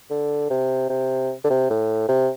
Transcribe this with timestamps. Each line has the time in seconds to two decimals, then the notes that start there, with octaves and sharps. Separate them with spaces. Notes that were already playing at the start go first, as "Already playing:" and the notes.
0.10 D3
0.50 C3
0.89 C3
1.45 D3
1.50 C3
1.70 A2
2.09 C3